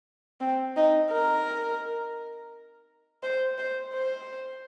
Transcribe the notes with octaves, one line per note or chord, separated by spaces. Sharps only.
C4
D#4
A#4
C5
C5
C5